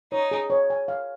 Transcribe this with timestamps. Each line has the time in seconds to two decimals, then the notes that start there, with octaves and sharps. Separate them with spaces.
0.12 D#4 C#5
0.31 G#4
0.50 C#5
0.70 G#5
0.88 F5